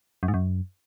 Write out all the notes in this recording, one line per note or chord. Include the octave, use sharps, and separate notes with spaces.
F#2
G#2
F#2